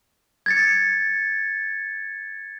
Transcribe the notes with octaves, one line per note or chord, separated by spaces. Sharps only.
G#6 A6 C#7